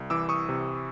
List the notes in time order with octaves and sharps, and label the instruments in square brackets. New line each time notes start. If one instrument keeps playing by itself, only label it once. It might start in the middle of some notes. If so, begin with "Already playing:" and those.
Already playing: [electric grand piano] C2
E3 D6 E6
C#6 D#6
C3